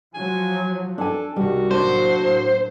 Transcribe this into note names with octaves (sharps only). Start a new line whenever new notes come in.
F3 F#3 G#5
D4 A4 G#5
C2 C3 D#3 G3 F#4
A2 F#3 A#3 D4 C5